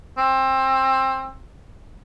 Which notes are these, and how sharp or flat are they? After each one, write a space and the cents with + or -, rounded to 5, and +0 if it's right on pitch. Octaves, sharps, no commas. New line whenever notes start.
C4 +25